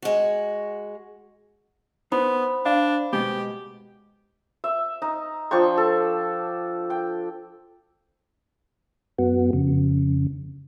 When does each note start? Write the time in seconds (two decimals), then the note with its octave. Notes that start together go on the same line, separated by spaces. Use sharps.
0.02 G#3 F#4
2.12 B3 D#4 C5 B5
2.66 D4 F5
3.13 B2 G#3 B3 G4
4.64 E5
5.02 D#4
5.51 F3 D4 G5 C#6
5.78 A4
6.90 G5
9.19 F#2 B3 F#4
9.53 F2 C#3